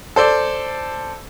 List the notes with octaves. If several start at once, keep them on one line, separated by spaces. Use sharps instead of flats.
A4 C5 D5